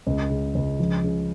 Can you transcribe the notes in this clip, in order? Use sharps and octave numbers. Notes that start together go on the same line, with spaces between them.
C#2
C#3
C#2
F3
C#3